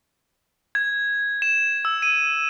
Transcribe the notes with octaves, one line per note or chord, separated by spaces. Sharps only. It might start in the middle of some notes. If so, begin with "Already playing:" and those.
G#6
E7
E6
D#7